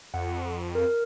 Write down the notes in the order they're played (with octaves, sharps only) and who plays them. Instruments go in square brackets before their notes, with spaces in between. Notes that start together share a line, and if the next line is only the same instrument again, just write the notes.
[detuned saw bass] F2 [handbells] F#5
[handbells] A#4